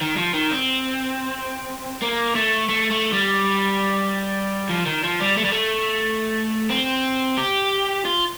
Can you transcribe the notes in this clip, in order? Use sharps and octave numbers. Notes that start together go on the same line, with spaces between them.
D#3
F3
D#3
C4
A#3
A3
A3
A3
G3
F3
D#3
F3
G3
A3
G3
A3
C4
G4
F4